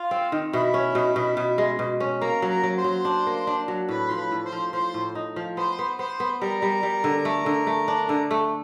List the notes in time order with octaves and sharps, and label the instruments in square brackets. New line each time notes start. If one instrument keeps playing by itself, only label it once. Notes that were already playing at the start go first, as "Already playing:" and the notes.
Already playing: [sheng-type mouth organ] F4 F5
[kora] C4
D#3
[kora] B2 [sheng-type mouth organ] E4 E5
[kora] C#4
B2
B2
B2
G#3
B2
C#4
[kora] A#3 [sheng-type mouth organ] A#4 A#5
[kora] F#3
[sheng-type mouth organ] A#4 A#5
[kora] F#3
[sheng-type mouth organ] C5 C6
[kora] F#3
D4
A#3
D4
F#3
[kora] A2 [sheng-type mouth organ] B4 B5
[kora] F3 [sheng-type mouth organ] C6
[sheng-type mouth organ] B4 B5
[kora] A2
[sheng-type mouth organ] C5 C6
[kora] F3
[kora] F3 [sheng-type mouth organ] C5 C6
[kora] A2
D#4
F3
[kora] B3 [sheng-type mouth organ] C5 C6
[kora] B3
[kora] B3 [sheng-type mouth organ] C5 C6
[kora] B3
[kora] G3 [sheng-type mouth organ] A#4 A#5
[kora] G3
G3
D3
A3
D3
A3
D4
D3
A3